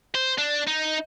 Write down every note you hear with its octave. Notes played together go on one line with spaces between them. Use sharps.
C5
D4
D#4